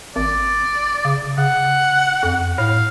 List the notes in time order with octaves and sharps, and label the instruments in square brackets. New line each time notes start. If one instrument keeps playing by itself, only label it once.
[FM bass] G#1 [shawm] D5
[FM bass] C#3
[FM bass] C#3 [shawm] F#5
[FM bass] F2
[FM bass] A2 [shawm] F5